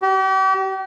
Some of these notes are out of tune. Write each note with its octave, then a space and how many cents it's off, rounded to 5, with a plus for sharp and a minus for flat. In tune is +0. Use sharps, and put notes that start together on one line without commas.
G4 -40